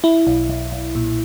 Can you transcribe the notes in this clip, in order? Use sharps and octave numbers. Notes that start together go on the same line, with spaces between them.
E4
B1
B1
B1
A#2